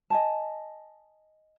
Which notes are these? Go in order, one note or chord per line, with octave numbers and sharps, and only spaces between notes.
D#5 G#5 A5